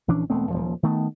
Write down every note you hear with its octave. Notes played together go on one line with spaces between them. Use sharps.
A#1 E3 C#4 D4
E1 A3 B3 C4
D#1 F#2 F3
D#3 A3 B3